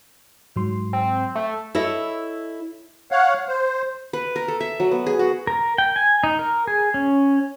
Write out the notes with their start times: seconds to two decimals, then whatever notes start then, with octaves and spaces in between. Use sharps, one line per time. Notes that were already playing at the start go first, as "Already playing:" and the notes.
0.56 G#2 F#3 C6
0.93 C4
1.35 A3
1.75 E4 A4 C#5 D#5 E5
3.11 C#5 F5 F#5
3.48 C5
4.13 B4
4.36 A#4
4.48 A4
4.60 E5
4.80 F#3
4.91 B3
5.06 G#4
5.19 F#4
5.47 A#4
5.78 G5
5.96 G#5
6.24 D#4
6.39 A#4
6.67 G#4
6.94 C#4